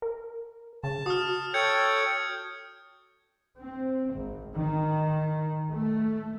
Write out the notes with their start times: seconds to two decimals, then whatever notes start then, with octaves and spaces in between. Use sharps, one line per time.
0.02 A#4
0.83 C#3 A5
1.06 F#4 D#6 F6
1.54 A4 C#5 G5 G6 G#6 C#7
3.59 C4
4.14 G#1
4.53 D#3
5.73 A3